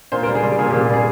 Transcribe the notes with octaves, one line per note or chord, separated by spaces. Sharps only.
A#2 C5
G3 A#4
G#4
G3
A#2 G#4
A#2 G4
G3 G#4